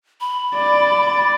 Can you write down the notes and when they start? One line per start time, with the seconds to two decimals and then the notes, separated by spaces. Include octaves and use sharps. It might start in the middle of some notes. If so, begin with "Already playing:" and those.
0.21 B5
0.55 D5